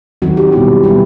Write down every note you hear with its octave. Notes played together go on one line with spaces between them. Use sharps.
D#3 F#3 C4 F#4
G4
B2 G3 B3 E4
B2 G3 B3 E4